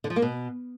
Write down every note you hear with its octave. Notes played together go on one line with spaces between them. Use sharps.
D3
F3
A#3
B2